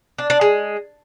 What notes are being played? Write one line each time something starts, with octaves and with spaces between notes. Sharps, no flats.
D4
D4
G#3